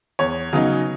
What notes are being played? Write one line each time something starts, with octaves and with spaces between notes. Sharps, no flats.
E2 C#5
C#3 F#3 B3 D#4